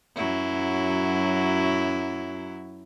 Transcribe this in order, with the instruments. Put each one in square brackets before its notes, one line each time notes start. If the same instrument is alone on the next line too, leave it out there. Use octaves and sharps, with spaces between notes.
[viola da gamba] F#2 F#3 E4